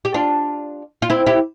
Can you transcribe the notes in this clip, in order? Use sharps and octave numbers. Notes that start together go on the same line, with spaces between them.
G4
D4 F4
F4
C4 E4
E4 G4